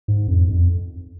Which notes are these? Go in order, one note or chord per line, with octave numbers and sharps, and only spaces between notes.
G#2
F2
F2